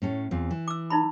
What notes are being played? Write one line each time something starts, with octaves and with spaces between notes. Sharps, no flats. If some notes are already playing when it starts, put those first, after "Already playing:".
A2 C#4 A4
E2 C4 F4
E3
D6 E6
D#4 E4 B5